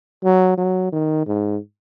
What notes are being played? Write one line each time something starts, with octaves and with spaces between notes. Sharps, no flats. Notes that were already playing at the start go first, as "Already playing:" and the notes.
F#3
F#3
D#3
G#2